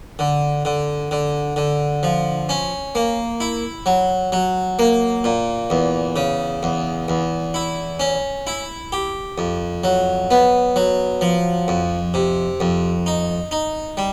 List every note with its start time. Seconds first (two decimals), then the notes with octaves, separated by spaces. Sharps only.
0.19 D3
0.65 D3
1.11 D3
1.56 D3
2.03 F3
2.49 C#4
2.95 A#3
3.40 E4
3.86 F#3
4.32 F#3
4.79 A#3
5.24 A#2
5.70 E2
6.16 C#3
6.63 E2
7.08 E2
7.54 E4
8.00 C#4
8.47 E4
8.92 G4
9.38 F2
9.84 F#3
10.31 B3
10.76 F#3
11.21 F3
11.68 F2
12.14 C3
12.60 F2
13.06 D#4
13.51 D#4
13.97 G3